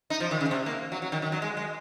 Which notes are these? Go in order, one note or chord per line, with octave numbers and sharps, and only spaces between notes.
D#4
F3
D#3
C#3
C3
A#3
F#3
F#3
D#3
D#3
F#3
G#3
G#3